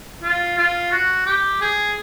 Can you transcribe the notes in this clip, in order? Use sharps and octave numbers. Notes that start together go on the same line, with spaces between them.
F4
F4
F#4
G4
G#4